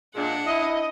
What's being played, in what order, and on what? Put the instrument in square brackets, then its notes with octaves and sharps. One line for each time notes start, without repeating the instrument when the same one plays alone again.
[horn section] A#2 G#3 [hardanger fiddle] D4 F#5
[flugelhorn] E4 [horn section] D#5